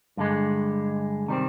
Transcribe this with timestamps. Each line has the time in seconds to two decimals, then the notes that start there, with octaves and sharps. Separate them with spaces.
0.17 G2 D3 G#3
1.28 C3 D#3 G3 C4